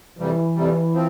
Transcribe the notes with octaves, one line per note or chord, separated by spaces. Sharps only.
F2 C3 E3 G3
F2 C3 G3
F3 C4